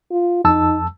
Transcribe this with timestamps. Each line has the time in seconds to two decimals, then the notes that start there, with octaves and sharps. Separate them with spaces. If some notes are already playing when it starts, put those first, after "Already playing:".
0.11 F4
0.45 F2 D#4 A5 E6